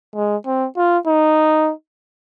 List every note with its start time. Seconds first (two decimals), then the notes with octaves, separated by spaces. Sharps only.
0.15 G#3
0.46 C4
0.77 F4
1.07 D#4